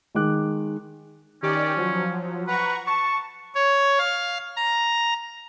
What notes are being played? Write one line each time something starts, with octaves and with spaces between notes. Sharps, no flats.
D#3 G#3 D6 F#6
D#3 C#4 G4 D5
F3 F#3
B4 F#5 A#5 C#6
A5 C#6
C#5
F5
A#5